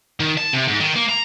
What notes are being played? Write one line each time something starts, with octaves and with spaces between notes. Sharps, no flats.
D#3
A5
C3
G#2
D#3
A#3
A#5